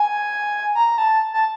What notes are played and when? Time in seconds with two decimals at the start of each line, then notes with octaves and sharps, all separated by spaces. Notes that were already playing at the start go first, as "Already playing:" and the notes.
Already playing: G#5
0.75 A#5
0.98 A5
1.33 A5